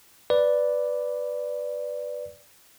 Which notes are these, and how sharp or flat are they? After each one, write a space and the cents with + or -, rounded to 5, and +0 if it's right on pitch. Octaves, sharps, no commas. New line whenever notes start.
B4 +0 D5 +0